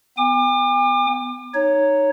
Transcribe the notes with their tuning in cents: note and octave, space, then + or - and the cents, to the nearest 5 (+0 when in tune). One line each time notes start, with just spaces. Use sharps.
B3 +15 G#5 -45 D6 +35
D#4 -5 C#5 +0